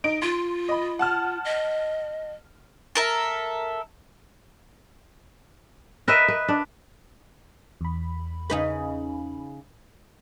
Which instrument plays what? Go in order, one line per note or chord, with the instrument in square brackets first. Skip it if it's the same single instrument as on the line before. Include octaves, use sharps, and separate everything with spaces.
[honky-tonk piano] D#4 D7
[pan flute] F4 [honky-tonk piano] C6
[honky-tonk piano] D#5 B5
F#5 A5 F6
[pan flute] D#5
[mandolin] A4 A#4 E5
[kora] A#4 B4 D#5 E5
B4
D4
[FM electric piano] E2 B5
[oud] C#3 D#4 B4